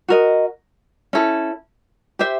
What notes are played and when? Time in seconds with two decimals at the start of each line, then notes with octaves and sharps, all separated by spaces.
0.08 F#4 A#4 D#5
1.13 C#4 E4 A4
2.19 G4 C5 E5